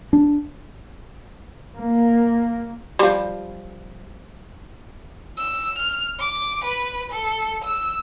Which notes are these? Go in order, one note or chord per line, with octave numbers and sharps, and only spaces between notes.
D4
A#3
F3 G3
E6
F6
D6
B4
A4
E6